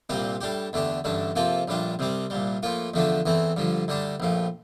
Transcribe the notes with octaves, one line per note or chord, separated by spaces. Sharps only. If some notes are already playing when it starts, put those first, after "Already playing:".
C2 A#2 G3 C4 G4
A2 G3 D4 G4
E2 D3 A3 D4 G4
A1 G2 D3 A3 D4
C3 F3 A#3 F4 A4
A#1 A2 G3 D4 F4
C2 C3 G3 C4
C2 A#2 G3
A2 F3 A#3 F4
E2 D3 F3 A3 D4
E2 E3 A3 C4
G2 D3 F3
D2 D3 G3 D4
A#1 A2 F3